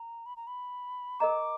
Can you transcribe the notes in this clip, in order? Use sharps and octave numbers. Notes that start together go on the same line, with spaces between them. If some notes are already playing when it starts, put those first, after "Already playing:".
Already playing: A#5
B5
A#5
B5
A#4 D#5 A#5 D6